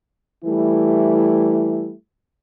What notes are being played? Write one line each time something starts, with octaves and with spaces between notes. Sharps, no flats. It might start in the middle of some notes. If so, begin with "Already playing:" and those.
E3 G3 A3 E4